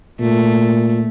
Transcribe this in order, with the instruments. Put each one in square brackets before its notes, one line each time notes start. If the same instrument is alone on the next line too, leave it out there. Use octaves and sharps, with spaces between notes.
[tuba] A#2 [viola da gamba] A3